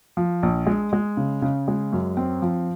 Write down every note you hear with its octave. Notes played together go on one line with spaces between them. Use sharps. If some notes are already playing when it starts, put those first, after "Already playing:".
F3
A#1
G#3
G#3
C#3
C#3
G#3
F#2
C4
F3